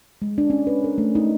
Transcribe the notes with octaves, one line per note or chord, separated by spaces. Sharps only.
G#3
D4
C#4
B4
A#4
A3
D#4